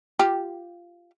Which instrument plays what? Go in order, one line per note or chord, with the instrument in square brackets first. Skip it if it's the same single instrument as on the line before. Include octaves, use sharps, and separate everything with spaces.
[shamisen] F4 G4